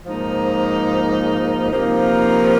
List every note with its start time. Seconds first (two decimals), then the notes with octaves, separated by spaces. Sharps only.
0.05 G#2 F3 A#3 D#4
1.73 C3 F3 A#3 D#4